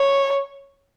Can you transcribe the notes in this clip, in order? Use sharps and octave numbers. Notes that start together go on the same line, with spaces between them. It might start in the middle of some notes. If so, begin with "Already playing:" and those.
Already playing: C#5